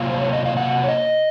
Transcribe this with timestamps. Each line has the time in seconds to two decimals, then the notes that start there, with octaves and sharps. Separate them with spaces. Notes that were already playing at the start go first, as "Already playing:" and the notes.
Already playing: C3 F#3 A#3 F4 F5
0.09 C5
0.21 C#5
0.33 D#5
0.45 F5
0.57 F#5
0.84 C#5
0.89 D#5